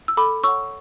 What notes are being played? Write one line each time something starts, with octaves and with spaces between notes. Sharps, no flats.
E6
A4 B5 D6
C#5 F#5 C#6 E6